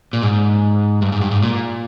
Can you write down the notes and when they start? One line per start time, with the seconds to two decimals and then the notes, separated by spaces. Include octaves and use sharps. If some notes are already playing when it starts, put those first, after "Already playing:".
0.13 A#2
0.23 G#2
1.02 G2
1.12 G#2
1.21 G2
1.31 G#2
1.42 A#2